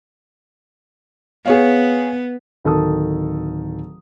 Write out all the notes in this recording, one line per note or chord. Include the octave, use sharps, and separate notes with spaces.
B3 G#4 C#5 F5
D1 D#3 A4 A5 D#6